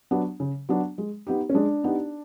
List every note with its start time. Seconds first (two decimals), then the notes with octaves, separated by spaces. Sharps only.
0.11 F#3 B3 D4
0.40 C#3
0.69 F#3 B3 D4
0.98 G#3
1.27 B3 D#4 G4
1.49 C#4
1.54 G#3 D4
1.84 B3 D#4 G4